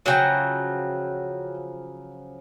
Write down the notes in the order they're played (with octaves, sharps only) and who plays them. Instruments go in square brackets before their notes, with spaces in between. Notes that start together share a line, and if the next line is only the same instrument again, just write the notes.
[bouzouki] C#3 F3 F#3 [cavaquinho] F#4 G5